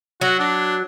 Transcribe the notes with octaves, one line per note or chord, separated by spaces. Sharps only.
F#3 F#4
D4